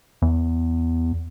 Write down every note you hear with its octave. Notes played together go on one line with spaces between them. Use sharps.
E2